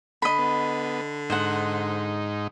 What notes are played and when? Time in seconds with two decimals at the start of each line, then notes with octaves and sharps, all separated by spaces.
0.22 D3 D#5 B5
0.39 B3
1.30 G#2 D#4 C5 F#5